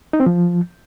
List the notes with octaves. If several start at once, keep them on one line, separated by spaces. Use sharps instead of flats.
D#4
C4
F3